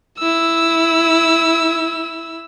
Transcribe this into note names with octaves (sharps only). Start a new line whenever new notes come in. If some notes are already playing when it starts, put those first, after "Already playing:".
E4 E6